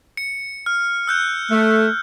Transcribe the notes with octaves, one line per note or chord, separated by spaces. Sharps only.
C#7
F6
E6 F#6 G6
A3